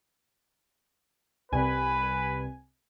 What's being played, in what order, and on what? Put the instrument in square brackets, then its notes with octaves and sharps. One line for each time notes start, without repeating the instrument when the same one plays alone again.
[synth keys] C2 G#5 [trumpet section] B4